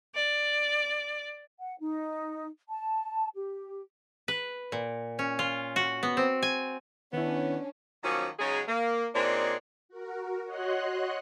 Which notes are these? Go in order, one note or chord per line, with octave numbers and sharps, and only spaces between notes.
D5
F#5
D#4
A5
G4
B4
A#2
C#4
F4
F#4
B3
C4
G#5
D#3 B3 C#4 D4 E4
D#3 F3 F#3 A#3 C#4
C#3 F#3 G#3 D#4 G#4
A#3
A#2 C4 D4 D#4 G#4 C#5
F#4 A#4
F#4 C#5 D#5 F#5 C6 F#6